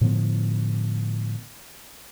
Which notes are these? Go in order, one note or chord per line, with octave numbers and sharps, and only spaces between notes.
A2 D3 F3 B3